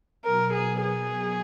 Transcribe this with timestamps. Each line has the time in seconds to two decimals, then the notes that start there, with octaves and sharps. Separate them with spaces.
0.25 B2 F#3 B3 A#4
0.53 G#4
0.82 G#4